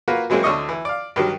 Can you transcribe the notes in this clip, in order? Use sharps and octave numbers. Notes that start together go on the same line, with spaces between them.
A#3 F4 F#4 A#4 B4
E3 F#3 G#3 A#3 C4
D2 D3 C#5 D#5 C#6
E3
D5 F5
G2 D#3 F#3